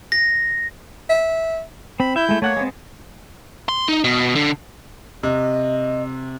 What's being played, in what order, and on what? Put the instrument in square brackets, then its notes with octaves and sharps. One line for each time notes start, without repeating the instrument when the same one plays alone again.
[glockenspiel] A#6
[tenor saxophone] E5
[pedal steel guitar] C4 [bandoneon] B5
[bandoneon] E4 G6 [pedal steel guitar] E5
[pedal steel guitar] G#3 A3
[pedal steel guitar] A3 F#5 F#6 [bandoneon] A#3 C#5
[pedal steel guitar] G#3 B3 C4
[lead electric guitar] C6
D#4
B2
D3
[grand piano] C3 [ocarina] D#5